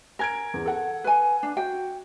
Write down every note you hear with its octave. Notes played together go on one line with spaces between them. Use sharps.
A#4 G#5 G#6 D7
E2
A4 F#5
B4 G#5
D4
F#4 G5